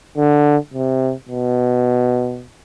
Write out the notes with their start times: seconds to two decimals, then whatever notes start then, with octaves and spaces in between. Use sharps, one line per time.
0.17 D3
0.74 C3
1.29 B2